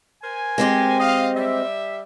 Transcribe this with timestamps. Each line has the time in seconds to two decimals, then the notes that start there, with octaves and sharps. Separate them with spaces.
0.23 A#4 C5 G#5
0.58 G#3 C4 G4
1.00 D#5 F5
1.35 G3 E5